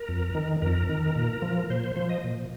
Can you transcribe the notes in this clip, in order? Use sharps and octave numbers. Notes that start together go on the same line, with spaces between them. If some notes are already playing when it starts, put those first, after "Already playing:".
Already playing: A#4
F2
D#3
F2 A#4
D#3
A#2
F3
A#2 C5
C5
F3 C5
D#5
A#2